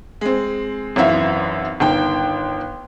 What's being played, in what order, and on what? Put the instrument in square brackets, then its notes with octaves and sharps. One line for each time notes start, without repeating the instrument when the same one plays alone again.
[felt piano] G#3 C4
G#1 F#2 E3 E5 F5
G1 D#3 G5